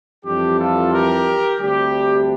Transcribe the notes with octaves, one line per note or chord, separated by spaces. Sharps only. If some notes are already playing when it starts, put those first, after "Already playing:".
F2 E3 G3 D4 G4
F4 A4
G4 A#4
D2 C3 G3 D4 G4